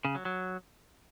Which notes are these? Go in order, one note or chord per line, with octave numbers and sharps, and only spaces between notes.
C#3
F#3
F#3